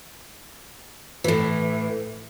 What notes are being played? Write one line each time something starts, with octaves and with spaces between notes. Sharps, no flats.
A2 E3